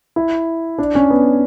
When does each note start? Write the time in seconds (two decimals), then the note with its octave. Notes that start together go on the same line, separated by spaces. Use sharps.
0.16 E4
0.78 D4
0.95 C#4
1.10 B3